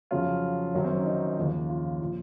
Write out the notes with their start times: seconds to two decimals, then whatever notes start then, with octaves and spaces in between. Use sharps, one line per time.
0.11 F2 C#3 F#3 F4
0.75 F#1 F#2 D#3 F#3 C#4
0.84 C4
0.95 C#4
1.06 D#4
1.37 D#2 C#3 F3
1.69 F4
2.02 A#2 F3